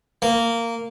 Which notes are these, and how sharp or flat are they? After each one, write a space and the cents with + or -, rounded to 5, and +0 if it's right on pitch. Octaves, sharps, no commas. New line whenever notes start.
A#3 -15